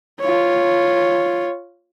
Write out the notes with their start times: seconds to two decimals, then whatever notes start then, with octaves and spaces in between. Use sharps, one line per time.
0.20 F4 C#5